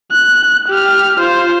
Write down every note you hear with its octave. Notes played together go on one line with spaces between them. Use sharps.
F#6
G4 F6
F4 C5